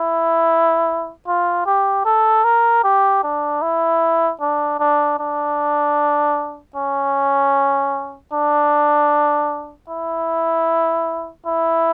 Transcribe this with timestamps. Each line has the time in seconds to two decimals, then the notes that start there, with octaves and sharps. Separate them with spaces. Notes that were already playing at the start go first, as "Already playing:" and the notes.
Already playing: E4
1.27 F4
1.66 G4
2.06 A4
2.44 A#4
2.84 G4
3.23 D4
3.62 E4
4.41 D4
4.80 D4
5.19 D4
6.76 C#4
8.33 D4
9.89 E4
11.47 E4